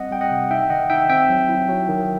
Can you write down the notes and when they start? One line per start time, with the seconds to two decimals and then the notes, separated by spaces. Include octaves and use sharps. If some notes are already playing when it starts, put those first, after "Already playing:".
Already playing: G3 C4 D#5 F#5
0.11 G3 G5
0.21 D#5 F#5
0.31 C3
0.51 D#4 E5 G5
0.70 D#3 D#5 F#5
0.90 D#4 E5 G5
1.09 C4 E5 G5
1.29 F#3
1.49 E4
1.69 F#3
1.88 D#3